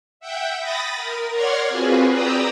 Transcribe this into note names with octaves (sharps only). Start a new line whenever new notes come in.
E5 F#5 G5 G6
B5 D#6 A6 A#6
A#4
C#5 D5 F#5 C6 F6 G#6
C4 F4 F#4 G#4 B4
B4 D5 G5 A#5 D#6 E6